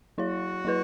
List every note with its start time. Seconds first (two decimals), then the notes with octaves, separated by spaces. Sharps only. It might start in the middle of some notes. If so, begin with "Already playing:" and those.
0.18 F#3 E4 F#4 C#5
0.65 F#3 E4 B4